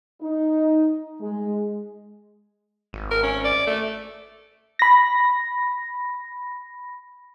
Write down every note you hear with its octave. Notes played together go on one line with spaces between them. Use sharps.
D#4
G#3
G#1
A#4
C#4
D5
A3
B5 A#6